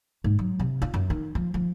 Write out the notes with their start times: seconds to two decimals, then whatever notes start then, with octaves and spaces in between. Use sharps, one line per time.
0.24 G#2
0.39 F#3
0.60 C3
0.82 F4
0.94 F#2
1.10 D#3
1.35 F3
1.54 F3